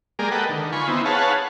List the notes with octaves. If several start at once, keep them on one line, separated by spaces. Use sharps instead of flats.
G#3 A#3 G4 G#4 A#4 D5
A4 B4 D#5 F#5 G5
D3 D#3
F4 G#5 B5 C#6
B3 C4 D#4 E4
G#4 B4 C#5 F5 F#5 A5